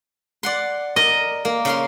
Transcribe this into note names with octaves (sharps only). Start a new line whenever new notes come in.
D5 F#5 C6
A#4 D5 D#5
A#3
C#3 F5 C6